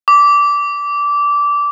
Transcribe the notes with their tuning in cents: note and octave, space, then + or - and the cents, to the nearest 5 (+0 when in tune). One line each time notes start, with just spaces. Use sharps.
D6 -15